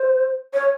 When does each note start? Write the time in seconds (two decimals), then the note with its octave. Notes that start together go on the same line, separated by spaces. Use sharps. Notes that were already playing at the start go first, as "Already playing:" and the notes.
Already playing: C5
0.54 C#5